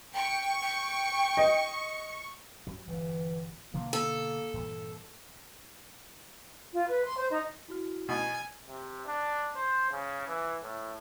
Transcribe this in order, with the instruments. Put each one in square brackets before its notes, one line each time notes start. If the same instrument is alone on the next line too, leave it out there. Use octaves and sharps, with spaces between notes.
[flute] G5 [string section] C#6
[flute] G5
[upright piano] D#5
[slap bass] G2 F#3
[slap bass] G1 G2 [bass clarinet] E3
[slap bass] B2 D3 D#3 [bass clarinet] A#3
[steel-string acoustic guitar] A4
[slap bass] G2 A#2 E3
[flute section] F4
B4
C6
C5
D#4
[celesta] E4 F#4 F6
[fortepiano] B2 [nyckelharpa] G#5
[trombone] C3
D4
C5
C#3
E3
A2